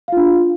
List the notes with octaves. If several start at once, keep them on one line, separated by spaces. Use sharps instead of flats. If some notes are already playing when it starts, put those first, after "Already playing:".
D4 F4 F5